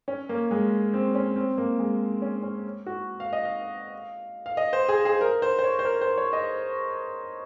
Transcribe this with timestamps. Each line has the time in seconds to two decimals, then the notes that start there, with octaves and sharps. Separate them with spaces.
0.08 C#4
0.29 A#3
0.51 G#3
0.94 C4
1.15 C#4
1.36 C4
1.58 A#3
1.79 G#3
2.22 C#4
2.43 C#4
2.86 F#4
3.20 F5
3.33 D#5
3.45 F5
4.46 F5
4.57 D#5
4.73 C5
4.89 G#4
5.05 G#4
5.21 A#4
5.42 C5
5.59 C5
5.64 C#5
5.79 C5
5.85 A#4
6.01 C5
6.18 C#5
6.33 D#5